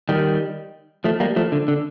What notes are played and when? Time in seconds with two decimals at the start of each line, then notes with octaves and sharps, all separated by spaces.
0.09 D#3 G3
1.04 F3 A3
1.20 G3 A#3
1.36 F3 A3
1.52 D3
1.68 D3